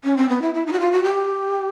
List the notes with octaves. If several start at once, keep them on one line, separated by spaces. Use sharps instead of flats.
C#4
C4
B3
E4
E4
D#4
F#4
F4
F#4
G4